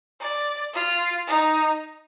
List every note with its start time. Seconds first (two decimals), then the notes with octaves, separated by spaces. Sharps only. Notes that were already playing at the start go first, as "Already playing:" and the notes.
0.21 D5
0.74 F4
1.27 D#4